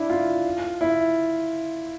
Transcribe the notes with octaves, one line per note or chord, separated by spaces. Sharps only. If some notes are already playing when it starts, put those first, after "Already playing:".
Already playing: D4 E4
F4
E4